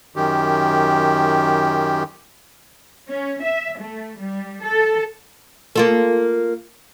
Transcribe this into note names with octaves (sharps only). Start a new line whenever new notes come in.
F#2 D#3 G4
C#4
E5
A3
G3
A4
A#3 F4 A4